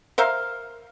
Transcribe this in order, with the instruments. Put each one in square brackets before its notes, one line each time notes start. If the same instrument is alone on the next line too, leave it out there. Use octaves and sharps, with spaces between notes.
[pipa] A#4 C5 E5 F5